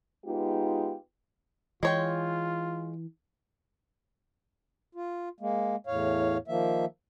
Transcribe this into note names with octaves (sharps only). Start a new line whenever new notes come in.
G#3 B3 D#4 F4 G4
E3 G#3 F4 C#5 G5
F4
G#3 A#3
E2 A2 C#5 F5
D#3 F3 A#3 E5